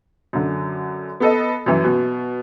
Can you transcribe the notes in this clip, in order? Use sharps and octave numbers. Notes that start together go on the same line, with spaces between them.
F#2 D3
B3 A4 D#5
F#2 E3
B2